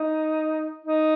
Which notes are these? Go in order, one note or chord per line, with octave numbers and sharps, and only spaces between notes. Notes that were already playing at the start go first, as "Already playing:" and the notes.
Already playing: D#4
D#4